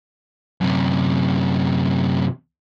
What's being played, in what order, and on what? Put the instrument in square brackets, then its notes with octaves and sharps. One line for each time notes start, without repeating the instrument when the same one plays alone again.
[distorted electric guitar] F#2 C3